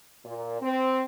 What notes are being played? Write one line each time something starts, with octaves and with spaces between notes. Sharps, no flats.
A#2
C4